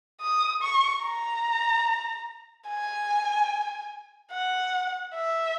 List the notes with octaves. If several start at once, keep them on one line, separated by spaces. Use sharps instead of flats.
D#6
C#6
A#5
G#5
F#5
E5